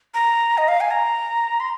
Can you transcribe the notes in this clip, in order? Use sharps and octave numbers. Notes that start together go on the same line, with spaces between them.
A#5
D#5
F5
G#5
A#5
C6